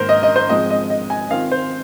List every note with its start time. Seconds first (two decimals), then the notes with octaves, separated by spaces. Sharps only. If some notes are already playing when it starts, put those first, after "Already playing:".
Already playing: G#2 D#3 A#3 A#4 C5
0.09 D#5
0.23 D#5
0.36 C5
0.49 G#2 F3 G#3 C4 D#5
0.70 D#5
0.90 D#5
1.10 G#5
1.30 D#3 C4 F4 F5
1.51 C5